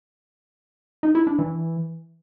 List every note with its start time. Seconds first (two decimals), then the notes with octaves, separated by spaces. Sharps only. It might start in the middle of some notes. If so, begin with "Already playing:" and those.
1.03 D#4
1.15 E4
1.27 D4
1.39 E3